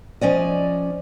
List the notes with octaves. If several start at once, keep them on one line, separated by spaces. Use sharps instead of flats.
F3 C#4 D5 D#5